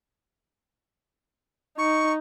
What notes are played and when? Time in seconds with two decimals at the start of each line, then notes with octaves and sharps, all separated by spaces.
1.78 D#4 C#6